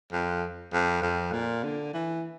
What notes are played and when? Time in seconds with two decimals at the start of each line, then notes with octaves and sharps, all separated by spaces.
0.12 F2
0.73 F2
1.03 F2
1.33 A#2
1.63 D3
1.94 E3